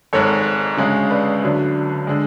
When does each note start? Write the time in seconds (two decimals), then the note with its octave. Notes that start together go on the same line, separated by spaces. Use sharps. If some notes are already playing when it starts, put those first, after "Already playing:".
0.13 G#1 G#2 G#3 A4 C#5
0.77 D2 C#3 G#3
1.10 B4 D5
1.43 D2 D3 F#3
2.07 D3 G#3